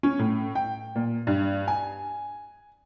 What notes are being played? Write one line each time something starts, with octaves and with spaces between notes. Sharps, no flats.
C#4
A2
G5
A#2
G2
G#5